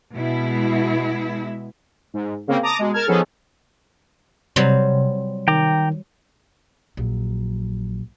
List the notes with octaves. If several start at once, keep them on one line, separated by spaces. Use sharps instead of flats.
B2 G#3 E4
G#2
C#3 A#3 C4
A5 A#5 D6 D#6
B2 G#3
A#4 A5 F6 G#6
F3 B3 C#4 D#4 G#4 A4
C3 F#3 G3 C4
D#3 G5 A#5 D6
A#1 F#3